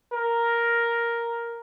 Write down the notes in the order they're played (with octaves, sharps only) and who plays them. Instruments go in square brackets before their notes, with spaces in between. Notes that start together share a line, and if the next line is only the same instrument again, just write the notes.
[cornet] A#4